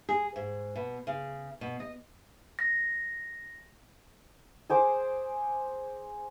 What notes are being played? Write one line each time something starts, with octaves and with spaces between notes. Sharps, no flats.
G#4
G#2
B2
C#3
B2
D#5
A#6
G#4 C5 D6